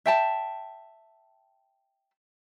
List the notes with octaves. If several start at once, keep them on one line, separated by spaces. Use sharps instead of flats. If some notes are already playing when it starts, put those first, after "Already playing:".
E5 G5 A5